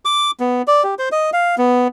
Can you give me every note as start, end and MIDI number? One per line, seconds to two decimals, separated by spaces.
0.05 0.31 86
0.40 0.62 59
0.67 0.83 74
0.83 0.95 67
0.99 1.09 72
1.12 1.30 75
1.33 1.55 77
1.58 1.88 59